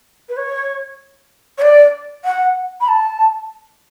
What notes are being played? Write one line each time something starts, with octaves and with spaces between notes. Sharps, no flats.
B4
C#5
C#5
D5
F#5
B5
A5